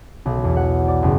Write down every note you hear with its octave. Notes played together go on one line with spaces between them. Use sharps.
B1
E2
F#5
D5
F#1